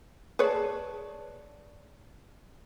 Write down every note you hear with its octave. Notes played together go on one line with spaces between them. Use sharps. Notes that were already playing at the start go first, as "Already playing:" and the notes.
G#4 B4 C#5 D5 A5